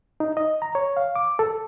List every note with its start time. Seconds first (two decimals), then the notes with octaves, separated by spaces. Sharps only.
0.20 D#4
0.37 D#5
0.62 A#5
0.75 C#5
0.97 F5
1.16 D6
1.39 A4